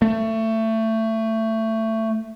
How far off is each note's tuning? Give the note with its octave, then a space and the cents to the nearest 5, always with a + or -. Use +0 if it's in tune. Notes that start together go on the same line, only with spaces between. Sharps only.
A3 +20